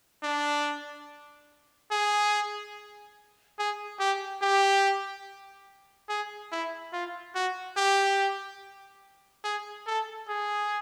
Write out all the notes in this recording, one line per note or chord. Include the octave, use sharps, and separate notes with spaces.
D4
G#4
G#4
G4
G4
G#4
E4
F4
F#4
G4
G#4
A4
G#4